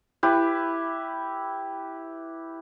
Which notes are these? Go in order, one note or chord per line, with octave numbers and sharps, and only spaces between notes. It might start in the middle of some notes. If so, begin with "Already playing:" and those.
E4 G4 B4